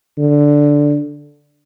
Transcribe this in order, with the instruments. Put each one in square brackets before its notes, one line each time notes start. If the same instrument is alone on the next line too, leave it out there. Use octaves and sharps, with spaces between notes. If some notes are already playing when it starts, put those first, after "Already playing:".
[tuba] D3